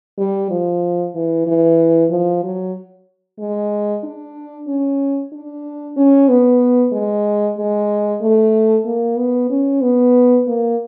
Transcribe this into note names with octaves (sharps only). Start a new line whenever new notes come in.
G3
F3
E3
E3
F3
F#3
G#3
D4
C#4
D4
C#4
B3
G#3
G#3
A3
A#3
B3
C#4
B3
A#3